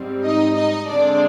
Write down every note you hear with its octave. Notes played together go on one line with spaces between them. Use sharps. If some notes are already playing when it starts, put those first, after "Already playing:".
Already playing: G#2 G3 C4
D#4 D#5
D#4 D#5
D3 G#3 C4 D4 D5